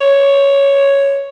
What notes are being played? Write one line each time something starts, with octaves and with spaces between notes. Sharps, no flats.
C#5